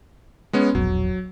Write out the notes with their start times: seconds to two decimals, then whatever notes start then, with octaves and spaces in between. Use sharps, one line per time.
0.53 G#3 B3 C#4
0.75 E1 A#1 F#3